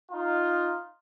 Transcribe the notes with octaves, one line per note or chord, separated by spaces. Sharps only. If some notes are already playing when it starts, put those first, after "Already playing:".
D#4 F4